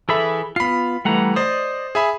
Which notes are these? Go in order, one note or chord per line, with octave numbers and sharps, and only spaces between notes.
E3 G#4 A4 E5 B5
B3 F4 B5 C7
E3 G3 A3 F#5 A#5
C5 D5 D#5 D#6
G#4 E5 B5